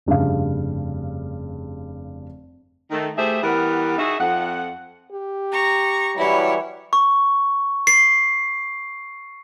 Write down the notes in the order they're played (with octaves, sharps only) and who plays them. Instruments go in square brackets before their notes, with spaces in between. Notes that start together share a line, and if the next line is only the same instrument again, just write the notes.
[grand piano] F1 G2 C#3 F5
[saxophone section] D#3 A3
A3 G4 G#4 C5 E5
E3 G3 B3 A#4 F#5
D#4 F#4 G#4 E5
F2 F#5
[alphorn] G4
[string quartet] A#5 C#6
[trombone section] E3 F#3 G3 [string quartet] E4 C#5
[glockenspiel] C#6
C7